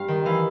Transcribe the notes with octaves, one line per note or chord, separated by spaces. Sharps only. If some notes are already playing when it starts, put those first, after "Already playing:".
Already playing: G2 F5
D#3
E3 F5